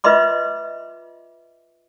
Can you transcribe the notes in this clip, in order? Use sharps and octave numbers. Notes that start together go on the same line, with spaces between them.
F4 B4 D#5 E5 C6 D6